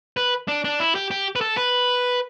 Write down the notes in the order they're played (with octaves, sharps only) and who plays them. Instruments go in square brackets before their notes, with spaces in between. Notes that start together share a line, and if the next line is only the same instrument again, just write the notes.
[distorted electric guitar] B4
D4
D4
E4
G4
G4
B4
A4
B4